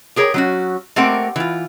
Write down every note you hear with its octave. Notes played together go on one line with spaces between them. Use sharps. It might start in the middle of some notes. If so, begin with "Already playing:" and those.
G4 G#4 A#4 C#5
F#3 C#4 F#4
A3 A#3 C4 G4 A#4 F#5
E3 F4